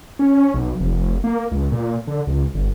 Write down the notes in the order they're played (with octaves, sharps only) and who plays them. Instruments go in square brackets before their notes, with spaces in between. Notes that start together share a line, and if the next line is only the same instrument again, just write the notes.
[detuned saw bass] C#4
B1
F1
A#3
C#2
A#2
D3
C#2
G1